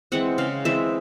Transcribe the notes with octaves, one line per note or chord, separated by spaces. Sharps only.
E3 G#3 C4 F#5
C#3 F5
E3 G#3 C4 E5